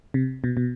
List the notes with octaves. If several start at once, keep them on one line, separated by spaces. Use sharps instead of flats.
C3
B2
B2